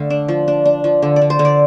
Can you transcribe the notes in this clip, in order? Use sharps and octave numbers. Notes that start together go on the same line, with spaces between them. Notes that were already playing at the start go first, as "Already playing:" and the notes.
Already playing: D3 A3 F5
D4
F3
D4
D4
F3
D3
D5
D3
C5
D3
D5